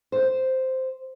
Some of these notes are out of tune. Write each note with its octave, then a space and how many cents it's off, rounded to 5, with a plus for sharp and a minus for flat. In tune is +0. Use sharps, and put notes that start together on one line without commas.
C5 -5